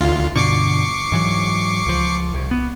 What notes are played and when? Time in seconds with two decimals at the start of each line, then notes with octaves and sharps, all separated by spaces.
0.01 D2 F4
0.36 G2 B2 D3 C#6 D6 C7
1.12 G#2 E3 F#3
1.86 C#2 F3
2.34 C2
2.51 B3